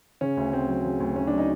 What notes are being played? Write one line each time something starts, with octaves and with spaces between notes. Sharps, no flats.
C#3 C#4
D2
D2 C4
F#3
C#3
D2
D2 C#4
D4
F#3
D#4